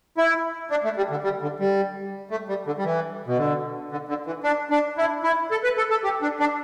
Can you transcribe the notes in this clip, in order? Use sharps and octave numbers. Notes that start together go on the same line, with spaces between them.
E4
D4
A3
G3
D3
G3
D3
G3
A3
G3
D3
G3
E3
B2
D3
D3
D3
E3
D4
D4
E4
E4
A4
B4
A4
A4
G4
D4
D4